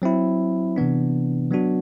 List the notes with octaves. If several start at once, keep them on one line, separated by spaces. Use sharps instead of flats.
F#3 C4 E4
C3 E3 B3 D4
F#3 B3 D4 F#4